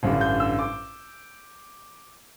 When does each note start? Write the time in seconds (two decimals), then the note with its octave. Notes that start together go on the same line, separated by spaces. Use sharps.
0.03 A1 G2 D3
0.21 G6
0.40 E6
0.59 D6